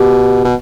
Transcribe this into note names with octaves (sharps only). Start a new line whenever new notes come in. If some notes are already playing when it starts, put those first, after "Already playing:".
Already playing: B2 G4
B2